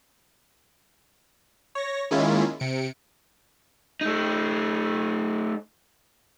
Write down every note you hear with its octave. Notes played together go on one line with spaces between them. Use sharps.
C#5 A#6
D#3 G#3 A#3 C#4 E4 F4
C3 C#7 D7
A3 D#4